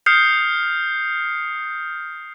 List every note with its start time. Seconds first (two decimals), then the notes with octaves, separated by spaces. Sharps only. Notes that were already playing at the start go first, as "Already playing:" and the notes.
0.06 D#6 F6 G6 C7 C#7